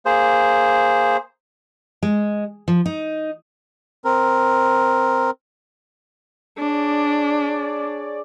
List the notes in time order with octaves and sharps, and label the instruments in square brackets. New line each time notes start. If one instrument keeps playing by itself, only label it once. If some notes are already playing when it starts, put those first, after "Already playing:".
[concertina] A#3 G#4 C5
[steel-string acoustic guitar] G#3
F3
D#4
[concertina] C4 A#4
[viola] D4 [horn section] G#4 C#5 D5